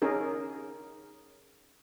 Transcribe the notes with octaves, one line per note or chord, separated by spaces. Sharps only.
C#4 D#4 G#4 A#4